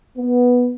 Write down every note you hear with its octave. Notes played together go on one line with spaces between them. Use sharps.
B3